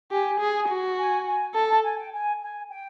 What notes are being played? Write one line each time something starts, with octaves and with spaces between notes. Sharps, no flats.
G4 G#5
G#4
F#4
G#5
G#5
A4 A5
A5
G#5
G5
G#5
G#5
G5